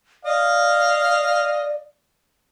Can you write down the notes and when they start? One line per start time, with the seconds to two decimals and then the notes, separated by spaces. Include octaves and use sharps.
0.25 D5 D#5 F5